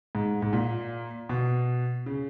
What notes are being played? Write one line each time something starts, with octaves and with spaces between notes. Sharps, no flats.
G#2
G#2
A#2
B2
C#3